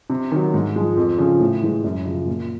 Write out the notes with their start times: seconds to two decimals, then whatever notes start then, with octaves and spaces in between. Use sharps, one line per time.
0.10 C3
0.32 D#3 F#3
0.54 G#2
0.76 F3 G#3
0.97 F2
1.18 C#3 F3
1.40 A2
1.63 E3 G#3
1.84 F#2
2.06 C#3 F3
2.27 A#2